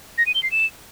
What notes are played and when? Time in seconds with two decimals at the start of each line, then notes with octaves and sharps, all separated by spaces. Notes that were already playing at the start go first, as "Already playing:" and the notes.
0.18 A#6
0.26 D#7
0.35 G7
0.43 C7
0.51 E7